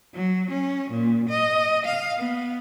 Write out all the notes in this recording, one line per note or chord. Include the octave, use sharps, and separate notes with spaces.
F#3
C#4
A#2
D#5
F5
B3